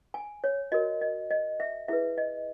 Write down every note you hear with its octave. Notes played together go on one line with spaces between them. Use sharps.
G#5
C#5
F#4 A#4 C#5 D#5
D#5
D#5
E5
E4 G#4 B4 E5
D#5